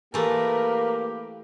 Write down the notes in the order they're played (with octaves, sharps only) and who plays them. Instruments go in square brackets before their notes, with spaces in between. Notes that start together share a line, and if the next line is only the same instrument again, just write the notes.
[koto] E3 A3 [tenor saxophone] A#3 [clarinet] G4 [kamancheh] A#4 B4